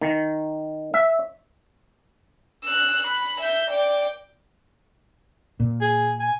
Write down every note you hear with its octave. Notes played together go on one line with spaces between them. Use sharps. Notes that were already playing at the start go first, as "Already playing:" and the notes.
D#3
E5
E6 F#6
B5
E5 G6
D5 G5
A#2
G#4
G#5